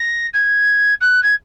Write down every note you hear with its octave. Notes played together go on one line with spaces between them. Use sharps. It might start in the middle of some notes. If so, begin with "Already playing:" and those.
Already playing: A#6
G#6
F#6
G#6